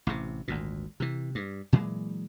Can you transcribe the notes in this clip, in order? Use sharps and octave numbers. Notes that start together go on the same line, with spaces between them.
A1 A2 C3
G#1 D2 A#2
C3 E3
G2
A#2 E3 F#3 G#3